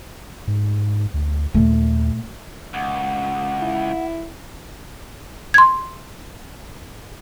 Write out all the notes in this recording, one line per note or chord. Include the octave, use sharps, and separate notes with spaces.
G#2
D2
D#2 A#2 A3
C#2 F#5
E4
C6 G#6